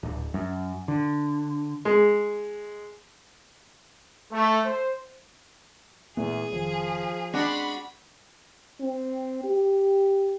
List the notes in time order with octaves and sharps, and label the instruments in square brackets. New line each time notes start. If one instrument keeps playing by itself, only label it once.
[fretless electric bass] D1
F#2
D3
[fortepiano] G#3
[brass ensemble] A3
C5
[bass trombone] E2 [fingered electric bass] A#2 A3 B3 [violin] G#4
[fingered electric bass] F1 D#3 [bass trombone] F3
[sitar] G#3 D4 F#4 [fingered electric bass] C4 [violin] B5
[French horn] C4
G4